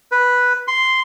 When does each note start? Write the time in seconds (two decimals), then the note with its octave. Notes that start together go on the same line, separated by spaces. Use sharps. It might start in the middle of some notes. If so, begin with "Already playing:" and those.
0.12 B4
0.68 C6